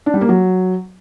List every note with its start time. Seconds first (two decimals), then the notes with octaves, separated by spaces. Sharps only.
0.06 D4
0.14 G3
0.21 A#3
0.29 F#3